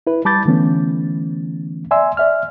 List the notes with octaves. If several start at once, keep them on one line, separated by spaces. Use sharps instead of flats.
E4 B4
G3 A5 B5 D6 G6 A6
D3 E3 A3 B3 C#4
D5 E5 G#5 C6 E6
D5 E5 F6